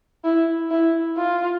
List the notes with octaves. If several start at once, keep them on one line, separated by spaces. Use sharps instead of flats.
E4
E4
F4